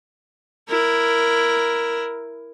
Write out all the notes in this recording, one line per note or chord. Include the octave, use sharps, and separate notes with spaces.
E4 A#4